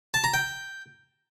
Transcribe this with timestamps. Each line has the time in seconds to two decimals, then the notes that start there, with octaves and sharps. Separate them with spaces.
0.14 A5
0.24 A#5
0.34 G5